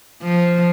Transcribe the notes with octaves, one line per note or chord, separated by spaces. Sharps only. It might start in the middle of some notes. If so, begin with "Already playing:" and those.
F3